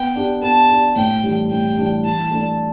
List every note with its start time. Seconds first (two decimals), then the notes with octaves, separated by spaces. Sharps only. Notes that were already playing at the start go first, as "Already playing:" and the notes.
Already playing: B3 G5
0.16 D4 G4
0.42 B3 A5
0.69 D4 G4
0.96 A2 G5
1.23 E3 G3 D4 G4
1.50 A2 G5
1.78 E3 G3 D4 G4
2.04 E3 A5
2.31 A3 D4 A4 D5